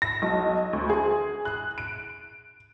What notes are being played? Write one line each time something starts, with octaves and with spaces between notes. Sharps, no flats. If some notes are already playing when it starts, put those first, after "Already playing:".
A#6
B1
D2
G#4
F#6
D7